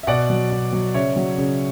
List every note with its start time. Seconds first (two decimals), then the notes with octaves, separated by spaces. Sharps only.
0.03 E5
0.07 B2 D5 F#5
0.30 F#3
0.51 B2
0.72 F#3
0.94 C#3 C#5 E5
1.16 F#3
1.38 C#3